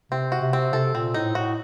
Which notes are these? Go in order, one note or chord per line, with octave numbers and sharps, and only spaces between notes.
C3 C4
F#4
C3
C4
C3 A4
A#2 C4
A2 D#4
A2 F#4